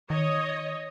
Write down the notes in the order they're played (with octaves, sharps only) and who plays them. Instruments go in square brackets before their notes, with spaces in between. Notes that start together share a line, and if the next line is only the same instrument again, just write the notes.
[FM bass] D#3 [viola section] C#5 D#5